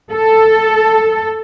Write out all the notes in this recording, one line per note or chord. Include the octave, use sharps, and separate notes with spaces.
A4